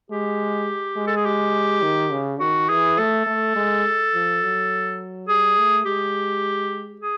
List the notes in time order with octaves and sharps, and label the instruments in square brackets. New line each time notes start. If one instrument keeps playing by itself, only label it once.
[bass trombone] G#3 [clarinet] G4
[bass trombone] G#3
[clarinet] A4
G#4
G4
[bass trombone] D#3
C#3
[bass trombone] D#3 [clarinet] F#4
[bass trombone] E3 [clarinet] G#4
[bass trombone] A3 [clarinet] A4
[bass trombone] A3
G#3
F3
F#3
[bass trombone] G3 [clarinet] G#4
[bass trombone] A3
[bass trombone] G#3 [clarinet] G4
[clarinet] G#4